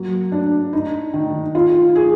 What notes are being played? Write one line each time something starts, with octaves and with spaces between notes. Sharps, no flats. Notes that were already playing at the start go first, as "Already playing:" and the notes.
Already playing: F#3 A#3
D4
D#4
D#3
F4
G#4